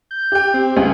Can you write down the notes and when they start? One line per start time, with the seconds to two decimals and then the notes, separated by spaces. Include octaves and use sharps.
0.11 G6
0.32 G4 G5
0.54 C4
0.77 C#2 G2 C3 G#4